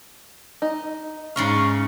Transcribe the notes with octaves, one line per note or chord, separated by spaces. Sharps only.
D#4
G#2 C#3 F5 C#6